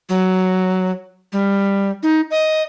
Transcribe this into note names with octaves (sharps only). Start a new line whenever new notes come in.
F#3
G3
D#4
D#5